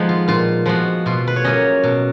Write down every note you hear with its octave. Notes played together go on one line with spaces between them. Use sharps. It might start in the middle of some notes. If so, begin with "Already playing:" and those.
Already playing: F3 G#3 B3 D#4
F4
A#2 F4
F3 G#3 B3 F#4
B2 F4
B4
C#5
F#3 A#3 C#4 D#5
B2